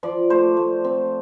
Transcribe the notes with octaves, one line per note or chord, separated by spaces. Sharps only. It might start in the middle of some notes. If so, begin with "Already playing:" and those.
F3 D5
A3 C5
A3
C4